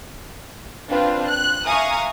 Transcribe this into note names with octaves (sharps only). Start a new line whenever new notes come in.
C4 D4 F4 B4
F#6
E5 F5 G#5 A#5 C#6 D#6